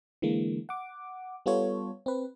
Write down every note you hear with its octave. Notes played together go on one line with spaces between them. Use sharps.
D3 E3 G#3 A#3
F#5 D6
G3 B3 F4 A4 C#5
C4 B4